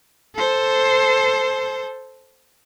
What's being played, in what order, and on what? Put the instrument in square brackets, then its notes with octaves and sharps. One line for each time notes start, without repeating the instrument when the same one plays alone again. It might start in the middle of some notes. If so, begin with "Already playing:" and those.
[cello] A4 C5